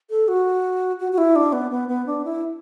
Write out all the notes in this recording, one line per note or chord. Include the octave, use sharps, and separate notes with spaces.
A4
F#4
F#4
F#4
E4
D4
B3
B3
B3
D4
E4